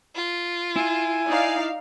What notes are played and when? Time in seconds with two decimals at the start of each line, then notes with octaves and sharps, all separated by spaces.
0.15 F4
0.76 E4 G#5
1.27 D#4 D5 F5